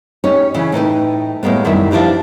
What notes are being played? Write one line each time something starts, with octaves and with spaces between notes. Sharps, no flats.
C#4 D#4 G4 C#5
C#3 E3 C#4
A2 D#4 B4 G5
A2 G3 G#3 A#3 B3
F#2 D#3 G3 E4 E5
F3 D4 E4 G4 B4